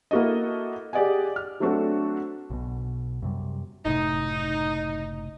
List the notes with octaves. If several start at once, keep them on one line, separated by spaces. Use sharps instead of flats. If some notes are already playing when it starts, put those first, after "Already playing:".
A#3 E4 F#4 A4 D#5
G4 G#4 D5 D#5 F#5 G#5
F6
F#3 A3 C4 D4 F#4 A4
B1 B2
F#2 C3 G3
F#1 A2 C3 D#4